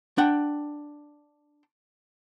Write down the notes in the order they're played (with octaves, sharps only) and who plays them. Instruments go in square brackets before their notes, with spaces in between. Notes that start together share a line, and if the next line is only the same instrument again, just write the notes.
[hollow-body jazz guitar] D4 F#5 G5